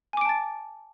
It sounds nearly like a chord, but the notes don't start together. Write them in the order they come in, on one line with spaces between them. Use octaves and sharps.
G#5 D6 D7 A5 A6